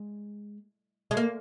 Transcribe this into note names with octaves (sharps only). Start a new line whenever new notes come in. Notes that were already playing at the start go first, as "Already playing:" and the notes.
Already playing: G#3
G#3
A#3